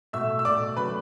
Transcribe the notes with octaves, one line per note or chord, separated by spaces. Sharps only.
B2 A3 E5 E6
E6
B2 A3 D5 D6
C#3 F#3 A3 B4 B5